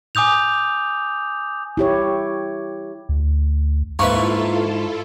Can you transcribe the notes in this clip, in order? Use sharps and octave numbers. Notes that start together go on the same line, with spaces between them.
G#5 D6 D#6 G6 F7
E4 G4 C#5
D2
G#2 A#3 E4 F4 A4 B4 E5 C#6